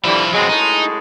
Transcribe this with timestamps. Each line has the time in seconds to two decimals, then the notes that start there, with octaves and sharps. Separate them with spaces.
0.04 D3 E3 F3 G3 E4
0.33 B2 F#3 G#3 C4
0.49 F#2 A2 G#3 D#4